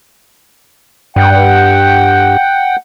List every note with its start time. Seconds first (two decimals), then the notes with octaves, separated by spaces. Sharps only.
1.16 G2 F#5 G5